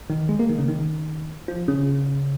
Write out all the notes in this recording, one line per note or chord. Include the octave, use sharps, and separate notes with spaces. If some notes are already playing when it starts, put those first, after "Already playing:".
D#3
G#3
A#3
D#3
C#3
D#3
F3
C#3